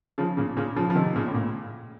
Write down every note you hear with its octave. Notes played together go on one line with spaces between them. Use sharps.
C#3 F3
A#2 C#3
A#2 C#3
C#3 F3
F3
C3 D#3
A#2 C#3
A2
A#2